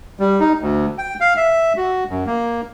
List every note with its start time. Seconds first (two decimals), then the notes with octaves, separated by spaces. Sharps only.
0.19 G3
0.40 D#4
0.60 D2
0.98 G5
1.21 F5
1.36 E5
1.77 F#4
2.09 F#2
2.27 A#3